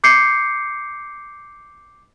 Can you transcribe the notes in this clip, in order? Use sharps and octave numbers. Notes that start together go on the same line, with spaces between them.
D6 G6 C7 C#7